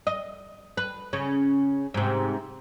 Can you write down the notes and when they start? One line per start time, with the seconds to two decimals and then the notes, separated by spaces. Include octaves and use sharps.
0.07 D#5
0.77 B4
1.13 C#3 C#4
1.94 G#2 C3